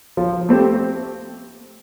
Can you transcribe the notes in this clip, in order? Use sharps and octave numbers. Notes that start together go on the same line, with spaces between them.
F3
A3 C4 G4